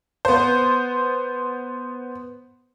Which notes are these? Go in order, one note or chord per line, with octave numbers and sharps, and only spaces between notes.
B3 C5